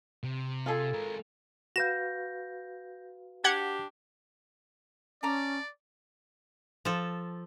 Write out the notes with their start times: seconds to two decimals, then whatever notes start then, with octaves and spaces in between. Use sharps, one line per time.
0.23 C3
0.66 F4 G#4 A4
0.93 G#3 A#4
1.76 F#4 B4 F5 G6 A#6 E7
3.44 D4 G4 F#5 G#6
5.23 C#4 D5 A5 A#5 D6
6.85 F3 A4